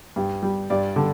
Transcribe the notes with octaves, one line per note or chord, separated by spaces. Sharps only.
G2
G3
G2 D5
D3 G3